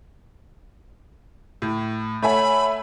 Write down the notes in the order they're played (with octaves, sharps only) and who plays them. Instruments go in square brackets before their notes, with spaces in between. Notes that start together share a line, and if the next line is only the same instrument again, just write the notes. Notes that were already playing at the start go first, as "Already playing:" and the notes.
[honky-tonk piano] A2
[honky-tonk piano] A3 E5 G#5 [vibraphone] C#5 F#5 [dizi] B5